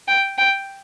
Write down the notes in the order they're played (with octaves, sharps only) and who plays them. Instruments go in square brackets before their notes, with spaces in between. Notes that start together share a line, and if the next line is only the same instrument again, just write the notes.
[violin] G5
G5